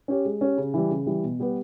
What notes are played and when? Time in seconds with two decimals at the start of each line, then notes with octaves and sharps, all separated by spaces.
0.08 C#4 G4 C#5
0.25 G#3
0.41 C#4 G4 C#5
0.58 C#3
0.74 E3 G3
0.90 C#3
1.07 E3 G3
1.23 B2
1.40 G3 B3 G4 B4